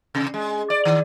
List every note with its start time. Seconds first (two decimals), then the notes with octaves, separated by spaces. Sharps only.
0.15 C3
0.34 G#3
0.70 D5
0.85 D#3